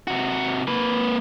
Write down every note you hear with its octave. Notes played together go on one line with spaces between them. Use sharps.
C3 F#4
A#3 B4